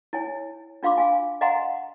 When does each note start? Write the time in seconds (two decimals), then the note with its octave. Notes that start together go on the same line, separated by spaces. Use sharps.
0.13 E4 C#5 G#5
0.83 D4 F4 F5 C6 D6
0.97 F5 G#5
1.41 D#5 F5 F#5 G#5 A#5 C6